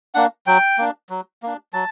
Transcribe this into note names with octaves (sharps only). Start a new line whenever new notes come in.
A#3 D4 F#5
F#3 G5
A#3 D4
F#3
A#3 D4
F#3 A5